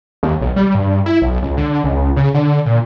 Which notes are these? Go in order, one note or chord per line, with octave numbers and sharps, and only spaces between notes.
D#2
B1
G3
G2
E4
B1
C#2
D3
C#2
C#3
D3
A#2